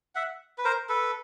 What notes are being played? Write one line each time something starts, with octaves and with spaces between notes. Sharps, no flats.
E5 F#5
B4
A#4 C5
A4 B4